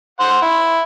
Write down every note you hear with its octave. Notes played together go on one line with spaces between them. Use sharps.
C5 F#5
E4